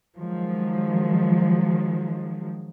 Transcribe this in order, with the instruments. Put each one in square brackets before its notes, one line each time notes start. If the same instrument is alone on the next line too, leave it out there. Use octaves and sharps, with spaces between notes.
[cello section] D#3 F3 F#3 G#3